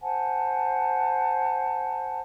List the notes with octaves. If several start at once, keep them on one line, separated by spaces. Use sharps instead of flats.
C5 F#5 G#5 A5